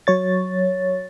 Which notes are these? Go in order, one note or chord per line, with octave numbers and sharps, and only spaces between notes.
F#3 C#5 A6